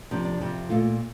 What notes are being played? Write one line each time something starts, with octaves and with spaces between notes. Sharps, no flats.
F2 C3 F3 D4
D4
F2 C3 F3
A#2 A3 F4